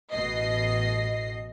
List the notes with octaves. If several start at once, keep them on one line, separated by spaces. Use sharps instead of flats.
A1 B2 D#5 C7